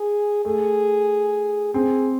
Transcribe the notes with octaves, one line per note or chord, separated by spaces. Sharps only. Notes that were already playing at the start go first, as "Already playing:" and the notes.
Already playing: G#4
A3 G#4
C4 G#4